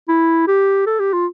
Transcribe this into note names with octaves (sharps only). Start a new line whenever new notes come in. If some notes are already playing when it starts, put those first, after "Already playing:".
E4
G4
A4
G4
F4